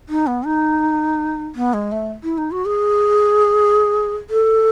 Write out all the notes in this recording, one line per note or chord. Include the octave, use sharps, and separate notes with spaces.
D#4
B3
D#4
B3
G#3
A3
E4
D#4
F#4
G#4
A4